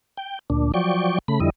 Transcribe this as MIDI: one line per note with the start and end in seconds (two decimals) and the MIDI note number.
0.17 0.39 79
0.50 0.72 38
0.50 0.72 46
0.50 0.72 62
0.74 1.19 53
0.74 1.19 54
0.74 1.19 74
0.74 1.19 79
0.74 1.19 85
1.28 1.40 49
1.28 1.40 57
1.28 1.40 83
1.40 1.50 41
1.40 1.50 50
1.40 1.50 55
1.40 1.50 64
1.40 1.50 75